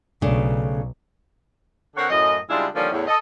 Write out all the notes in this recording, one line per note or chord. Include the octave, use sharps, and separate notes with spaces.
B1 C#3 A3 D4
D3 C4 A#4 C#5 F#5
F#2 A2 D#5
C#3 G3 G#3 D4 E4 F4
D3 D#3 F3 G3 A#3 C#4
E2 A2
A4 D#5